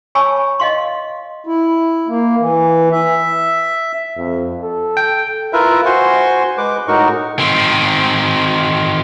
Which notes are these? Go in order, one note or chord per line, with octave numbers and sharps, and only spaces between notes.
C#5 G#5 A5 B5 C#6 E6
D#5 F5 C6
E4
A#3
E3
E5
F2
A4
G5
E4 F4 A#4 B4 E5
F#4 C5 G#5 C6 C#6
G#3 B4 D6
A2 G#3 D#4 F#4 A#4 C#6
D#3 C4